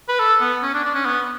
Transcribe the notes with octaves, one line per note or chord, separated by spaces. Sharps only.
B4
A4
B3
C#4
D4
D4
C#4
B3